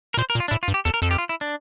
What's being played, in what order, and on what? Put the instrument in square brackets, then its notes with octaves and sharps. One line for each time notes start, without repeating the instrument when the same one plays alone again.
[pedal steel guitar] A#4
[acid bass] A#2 [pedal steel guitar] C5
[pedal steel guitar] A#4
[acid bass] A#2
[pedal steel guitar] F4
D4
[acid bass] A2 [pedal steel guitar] E4
[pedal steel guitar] F4
[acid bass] G2
[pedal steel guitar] G4
[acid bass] E2 [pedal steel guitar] A4
[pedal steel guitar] A#4
[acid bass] F2 [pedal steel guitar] A4
[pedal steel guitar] G4
F4
E4
D4